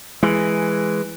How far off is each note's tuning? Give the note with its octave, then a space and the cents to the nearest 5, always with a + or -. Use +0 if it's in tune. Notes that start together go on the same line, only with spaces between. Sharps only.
E3 +5 G#3 +0